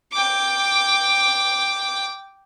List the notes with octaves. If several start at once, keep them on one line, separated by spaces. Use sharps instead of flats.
G5 D6